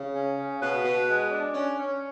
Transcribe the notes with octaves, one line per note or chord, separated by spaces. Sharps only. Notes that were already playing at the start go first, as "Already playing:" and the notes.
Already playing: C#3
C#4
C#3
B2 B4
B2
G#3
D4
C#4
C#4